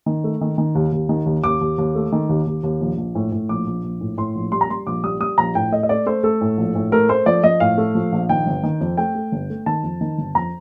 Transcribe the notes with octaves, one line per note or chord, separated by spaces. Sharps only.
D#3
A3
D#3
D#3
D#2
D#2
D#3
D#2
D#2 D6
D#2
D#2
A3
D#3
D#2
D#2
D#2
A#1
A#1
A2
A2
A#1 D6
A#1
A#1
A2
A2 C6
A#1
G3 C6
A#5
G3 C6
A#1 D6
G3 D#6
G3 D#6
A#1 A#5
A2 G5
A3 D#5
D#5
A3 D5
A3 C5
A3 A4
A2
A#1
A2
A3 A#4
A3 C5
F3 D5
F3 D#5
A2 F5
A3
F3
A#1
D#3 G5
G1
D#3
F2
A3 G5
A3
G1
A3
D#3 A5
F2
D#3
G1
F2 A#5